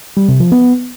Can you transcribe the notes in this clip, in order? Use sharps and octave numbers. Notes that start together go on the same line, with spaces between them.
G3
C3
F3
B3